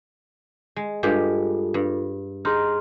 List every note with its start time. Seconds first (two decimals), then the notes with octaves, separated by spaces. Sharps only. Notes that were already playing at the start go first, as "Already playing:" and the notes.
0.76 G#3
1.03 G2 G#3 F4 G4 A4
1.74 G2
2.45 D#4 G#4 C6 F6